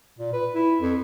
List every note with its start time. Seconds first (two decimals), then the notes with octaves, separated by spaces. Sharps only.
0.18 A#2
0.33 B4
0.54 E4
0.81 F2